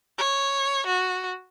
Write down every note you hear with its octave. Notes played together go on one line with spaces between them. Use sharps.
C#5
F#4